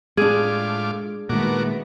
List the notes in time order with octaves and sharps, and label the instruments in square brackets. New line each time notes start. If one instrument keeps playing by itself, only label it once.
[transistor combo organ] A2 F4 D6 [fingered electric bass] G#3 [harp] D4 G#4
[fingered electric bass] A#2 D#3 [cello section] G#3 A3 B3 [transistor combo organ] F#4 A#4 D6